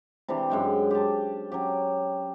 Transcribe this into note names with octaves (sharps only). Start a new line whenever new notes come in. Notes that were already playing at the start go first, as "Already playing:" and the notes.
C3 E3 D4 G4
F#2 G#3 G5
G4 A5
F#3 C#4 G4